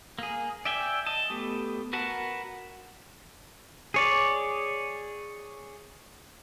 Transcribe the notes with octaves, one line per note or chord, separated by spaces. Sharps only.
A#3 G#4
D5 E5 G5 G#5
D#5 A5
A3 B3 G4
F#4 A#4 B4 F#5 A5
G#4 C#5 D5